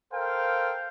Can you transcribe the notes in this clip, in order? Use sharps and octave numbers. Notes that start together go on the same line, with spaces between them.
A4 A#4 C5 F5 G5